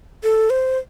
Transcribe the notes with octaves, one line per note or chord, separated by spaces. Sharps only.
A4
C5